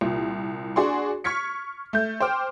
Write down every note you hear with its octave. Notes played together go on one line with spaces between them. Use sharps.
C2 A#2
D4 F#4 G#4 D5 C6 C#6
C#6 F6 G#6 B6 C#7
A3 G6
C5 G5 D6 F6